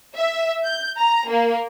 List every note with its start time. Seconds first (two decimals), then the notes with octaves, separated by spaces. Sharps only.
0.15 E5
0.64 G6
0.98 A#5
1.28 A#3